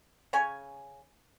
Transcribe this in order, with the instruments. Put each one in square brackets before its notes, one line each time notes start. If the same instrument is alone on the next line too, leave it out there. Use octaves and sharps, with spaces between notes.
[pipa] C#3 C#4 C#5 G#5